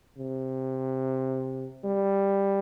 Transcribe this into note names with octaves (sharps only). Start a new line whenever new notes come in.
C3
G3